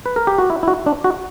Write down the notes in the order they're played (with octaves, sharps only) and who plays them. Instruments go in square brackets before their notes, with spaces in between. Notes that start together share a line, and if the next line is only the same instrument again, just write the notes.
[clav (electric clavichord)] B4
A#4
G4
F#4
E4
E4
F#4
D4
F#4